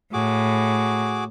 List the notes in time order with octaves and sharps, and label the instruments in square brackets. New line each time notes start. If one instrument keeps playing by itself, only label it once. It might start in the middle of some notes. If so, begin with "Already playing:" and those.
[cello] A2 [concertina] F#4 G#4 D6